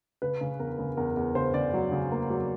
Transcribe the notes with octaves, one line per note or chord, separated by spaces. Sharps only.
C#3 B4
C#3
E2 A#4
C#3
E2 A#4
E2
C#3 C5
C#3 D5
F#3
C#3
A#3
F#3